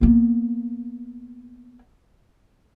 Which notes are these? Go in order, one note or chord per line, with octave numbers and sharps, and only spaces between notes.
A#3 B3